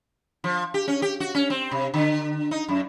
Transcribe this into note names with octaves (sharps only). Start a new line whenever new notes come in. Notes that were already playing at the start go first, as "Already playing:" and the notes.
F3
G4
C#4
G4
F#4
C#4
C4
C3
D3
D#4
F#2